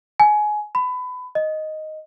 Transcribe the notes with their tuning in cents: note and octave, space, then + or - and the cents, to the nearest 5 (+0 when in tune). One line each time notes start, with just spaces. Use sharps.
G#5 +20
B5 +25
D#5 +0